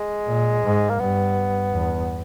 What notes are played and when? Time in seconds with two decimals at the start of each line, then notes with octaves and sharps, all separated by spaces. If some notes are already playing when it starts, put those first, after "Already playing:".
Already playing: G#3
0.27 A#2
0.64 G#2
0.89 A#3
0.99 G2 B3
1.72 E2